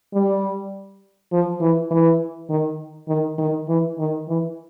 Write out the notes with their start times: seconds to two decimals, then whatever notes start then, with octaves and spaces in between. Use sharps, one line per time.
0.14 G3
1.32 F3
1.61 E3
1.91 E3
2.50 D#3
3.09 D#3
3.38 D#3
3.68 E3
3.98 D#3
4.28 E3